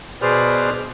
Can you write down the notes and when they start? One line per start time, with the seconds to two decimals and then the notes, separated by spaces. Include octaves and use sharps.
0.22 B2 G#4 B4 C5 D5 F6